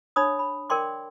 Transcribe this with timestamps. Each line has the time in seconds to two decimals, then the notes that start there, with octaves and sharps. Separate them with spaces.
0.16 D4 C#5 B5 D#6
0.39 B5
0.70 A#4 D5 G5 C6 D6